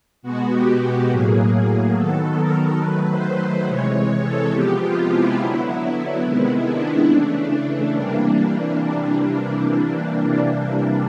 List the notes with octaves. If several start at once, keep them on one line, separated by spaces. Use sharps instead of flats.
B2 G#3 B3 F#4
G4
G4
A2 F#3 A#3 G#4
G#4
D#3 F#3 B3 A4
A#4
D#3 F#3 A3 B4
C5
C5
C3 E3 G#3 C#5
C#5
A4
C3 F3 G#3 B3 G4
F4
E4
D3 F#3 B3 E4
C3 D#3 G#3 B3 E4
D4
C#3 E3 A3
C3 E3 G3 A#3